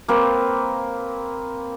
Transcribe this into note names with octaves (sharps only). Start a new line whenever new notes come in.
A#3 C4 B4